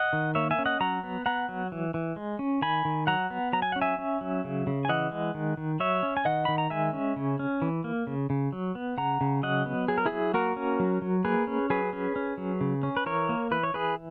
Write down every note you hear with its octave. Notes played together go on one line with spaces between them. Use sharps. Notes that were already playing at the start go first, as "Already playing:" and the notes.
Already playing: D#5 F#5
D#3
A#3 C#5 E5
E5 G#5
C#4
D#5 F#5
F#3 F#5 A#5
B3
B3 F#5 A#5
F#3
E3
E3
G#3
C#4
D#3 G#5 B5
D#3
F#3 F#5 A#5
B3
F#3 A#5
G#5
C#4 F#5
E5 G#5
C#4
F#3
C#3
C#3
G#5
E3 D#5 F#5
G#3
D#3
D#3
F#3 C#5 E5
C#4
G#5
D#3 D#5 F#5
D#3 B5
A#5
G#3 E5 G#5
C#4
C#3
C#4
E3
A#3
C#3
C#3
F#3
B3
C#3 F#5 A#5
C#3
F#3 D#5 F#5
B3
F#3 G#4
A#4
E4 G#4
F#3
A#3 F#4 A#4
C#4
F#3
F#3
A#3 G#4 B4
C#4
F#3 G#4 B4
C#4
C#4
F#3
C#3
C#4
B4
E3 A#4 C#5
A#3
E3 B4
C#5
E3 G#4 B4